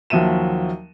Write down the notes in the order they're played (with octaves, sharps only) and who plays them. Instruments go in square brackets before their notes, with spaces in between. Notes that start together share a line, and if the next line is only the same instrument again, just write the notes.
[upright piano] D#2 F3 F#3 E5 D#7 E7